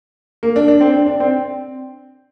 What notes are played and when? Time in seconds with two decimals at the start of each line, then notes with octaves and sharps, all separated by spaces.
0.43 A#3
0.56 D4
0.68 D4
0.81 C4
0.94 D4
1.06 D4
1.20 C4